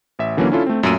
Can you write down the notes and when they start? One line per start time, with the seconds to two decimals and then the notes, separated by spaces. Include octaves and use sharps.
0.19 A1 E5
0.37 D3 E3 F#3 A#3 C#4
0.52 C#4 D4 E4 F4 A4
0.66 A3 C4
0.83 F#2 A#2 A3 E6 D7 D#7